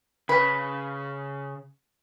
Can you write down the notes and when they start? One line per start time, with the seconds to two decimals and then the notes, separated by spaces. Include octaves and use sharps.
0.29 C#3 B4